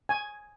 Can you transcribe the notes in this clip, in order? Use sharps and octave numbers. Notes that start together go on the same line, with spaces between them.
G#5